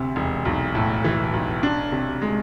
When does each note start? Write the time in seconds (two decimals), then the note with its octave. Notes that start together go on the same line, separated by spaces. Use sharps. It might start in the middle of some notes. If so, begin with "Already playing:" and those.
Already playing: D2 C3
0.16 E1
0.45 B1
0.75 A2
1.04 E3
1.33 B1
1.63 D4
1.92 C3
2.22 G#3